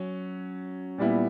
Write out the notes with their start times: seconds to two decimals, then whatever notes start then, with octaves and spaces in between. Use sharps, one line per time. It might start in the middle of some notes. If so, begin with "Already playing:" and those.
Already playing: F#3 C#4
0.98 A#2 G3 B3 E4